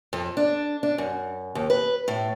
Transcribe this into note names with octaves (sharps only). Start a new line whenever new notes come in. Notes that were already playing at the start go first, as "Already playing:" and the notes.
F2
D4
D4
F#2
D#2
B4
A2